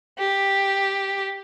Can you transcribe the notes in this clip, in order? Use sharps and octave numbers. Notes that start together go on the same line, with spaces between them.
G4